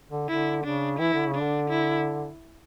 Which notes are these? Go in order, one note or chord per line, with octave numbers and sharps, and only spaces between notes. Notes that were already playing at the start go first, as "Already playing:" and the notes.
D3
D3 E4
C#3 D4
E3 E4
D3
C#3
D4
D3
E4